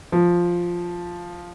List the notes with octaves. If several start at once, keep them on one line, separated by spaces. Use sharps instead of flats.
F3